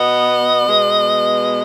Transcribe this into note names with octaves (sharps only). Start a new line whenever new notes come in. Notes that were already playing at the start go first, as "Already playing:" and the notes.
Already playing: B2 B3 D#5
B2 G#3 B3